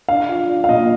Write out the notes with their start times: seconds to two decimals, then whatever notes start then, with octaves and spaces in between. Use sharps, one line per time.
0.08 D4 F5
0.29 F4
0.49 D4
0.64 F5
0.69 A#2 D#5